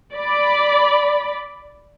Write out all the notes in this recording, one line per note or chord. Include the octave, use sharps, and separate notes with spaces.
D5 B5